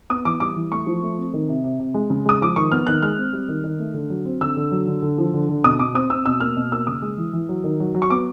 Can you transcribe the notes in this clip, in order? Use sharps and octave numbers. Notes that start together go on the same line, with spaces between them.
B3 D#6
E3 D6
G3 D6
E3
A3 C#6
F3
A3
C4
D#3
C3
C3
C3
G#3
C#3
G#3 D#6
F3 D6
D#3 C#6
B3 F6
D#3 F#6
G#3 F6
C4
G3
D#3
D#3
A3
D3
F#3
C4
D3 E6
D3
F#3
D3
D3
F3
D3
D3
B2 D#6
B2 D6
C4 D#6
C4 E6
B2 E6
A#3 F6
B2
A#3 E6
C#3 D#6
G#3
E3
E3
F#3
D#3
F#3
F#3
C#6
B3 D6